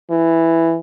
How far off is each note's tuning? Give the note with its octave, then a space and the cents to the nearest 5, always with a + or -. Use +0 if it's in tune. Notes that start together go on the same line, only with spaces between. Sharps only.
E3 +5